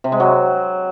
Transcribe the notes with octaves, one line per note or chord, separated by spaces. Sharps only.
C3
G#3
F#3